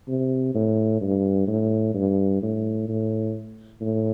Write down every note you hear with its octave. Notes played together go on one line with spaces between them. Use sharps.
C3
A2
G2
A2
G2
A2
A2
A2